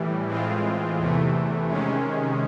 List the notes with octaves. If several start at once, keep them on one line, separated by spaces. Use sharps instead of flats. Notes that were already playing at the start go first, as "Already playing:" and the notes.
Already playing: A2 E3 G3
A2 E3 G#3 C4 F4
E2 C3 E3 A3
C3 D#3 G#3 C#4